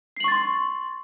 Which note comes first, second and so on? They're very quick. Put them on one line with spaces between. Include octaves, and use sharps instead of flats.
C7 F#7 C#6 A6 C6